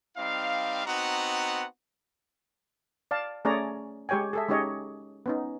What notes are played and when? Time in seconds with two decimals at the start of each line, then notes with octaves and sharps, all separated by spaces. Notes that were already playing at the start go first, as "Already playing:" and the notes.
0.17 G3 C4 D#4 F5
0.86 B3 C4 D#4 F#4 F#5 A#5
3.11 D5 F5 A5
3.45 A3 C#4 G#4 C#5 D5 A#5
4.09 G#3 G4 C#5 G5 G#5
4.33 G#4 A4 E5
4.48 G#3 C#4 D#4 G4 C#5 D#5
5.26 B3 C#4 D#4